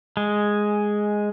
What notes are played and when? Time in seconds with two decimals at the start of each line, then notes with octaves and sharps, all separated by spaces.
0.17 G#3